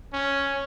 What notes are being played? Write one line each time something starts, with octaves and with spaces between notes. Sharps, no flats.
C#4